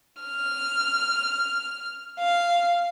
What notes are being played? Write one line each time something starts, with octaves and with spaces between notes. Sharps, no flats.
F6
F5